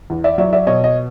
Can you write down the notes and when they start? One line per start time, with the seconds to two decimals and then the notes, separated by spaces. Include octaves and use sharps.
0.10 E2
0.24 D5 E5
0.38 F#3 D5 E5
0.53 D5 E5
0.67 B2 C#5 D#5
0.84 D#5